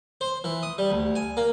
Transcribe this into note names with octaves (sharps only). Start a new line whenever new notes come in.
C5
E3
D#6
G3
D2
G#5
A#3